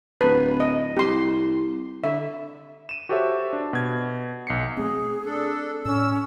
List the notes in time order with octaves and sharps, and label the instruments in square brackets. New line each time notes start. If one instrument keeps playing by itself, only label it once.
[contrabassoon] D1 [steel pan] B4
[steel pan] D#5
[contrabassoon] C2 [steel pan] G4 C6
[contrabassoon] D3 [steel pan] E5
[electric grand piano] D#7 E7
F#4 G4 A4 C5 C#5 E5
D4
B2 G#6
B1 C7 C#7
[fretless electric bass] A3 C4 [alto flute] G#4
[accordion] D4 A4
[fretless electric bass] A2 [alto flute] C#4 [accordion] E6